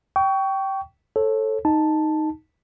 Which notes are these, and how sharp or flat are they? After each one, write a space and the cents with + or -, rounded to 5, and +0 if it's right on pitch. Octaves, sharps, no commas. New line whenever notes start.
G5 -15 C#6 +25
A4 +0 C#5 -35
D#4 +0 A5 +0